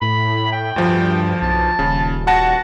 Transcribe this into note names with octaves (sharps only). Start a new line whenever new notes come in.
A2 B5
G5
D2 G2 F3
B1 A5
D#1 C#3
F#4 F#5 A5 A#6